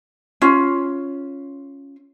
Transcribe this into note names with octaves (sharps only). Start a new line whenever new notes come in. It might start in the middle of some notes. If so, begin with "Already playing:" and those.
C#4 F4